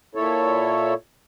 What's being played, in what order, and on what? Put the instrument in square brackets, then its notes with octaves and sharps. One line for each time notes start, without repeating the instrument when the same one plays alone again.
[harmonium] A#2 E4 A4 C#5